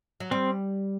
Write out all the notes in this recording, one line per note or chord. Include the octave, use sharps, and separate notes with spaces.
F#3
G3 C4